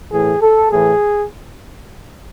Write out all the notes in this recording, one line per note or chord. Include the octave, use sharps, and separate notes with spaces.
A2 E3 G#4
A4
A2 E3 G#4